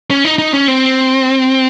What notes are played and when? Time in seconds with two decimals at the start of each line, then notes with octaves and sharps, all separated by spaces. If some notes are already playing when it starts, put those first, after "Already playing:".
0.10 C#4
0.25 D#4
0.39 D#4
0.54 C#4
0.68 C4